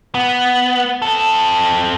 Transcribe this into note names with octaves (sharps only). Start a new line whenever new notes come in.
B3
C4 A4